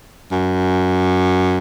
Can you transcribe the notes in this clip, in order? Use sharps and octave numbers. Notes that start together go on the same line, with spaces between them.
F#2